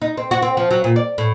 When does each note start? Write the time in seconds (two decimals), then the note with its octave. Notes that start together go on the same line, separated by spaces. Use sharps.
0.02 D#4
0.17 C4
0.31 F#4
0.42 C4
0.57 F3
0.71 F#3
0.84 A#2
0.96 D5
1.18 A2